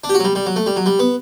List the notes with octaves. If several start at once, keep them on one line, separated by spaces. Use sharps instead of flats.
D4
G4
F#4
F#3
G3
G3
F#3
A3
G3
F#3
G3
B3